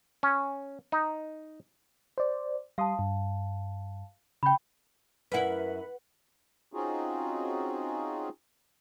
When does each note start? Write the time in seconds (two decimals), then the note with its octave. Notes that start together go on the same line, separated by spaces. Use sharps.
0.23 C#4
0.92 D#4
2.18 C5 D5
2.78 G3 F5 A5 C6 D#6
2.99 G2
4.43 C#3 G5 B5 G6
5.32 F#2 E4 A#4 B4 F#5
6.73 C4 C#4 D#4 F4 F#4 G#4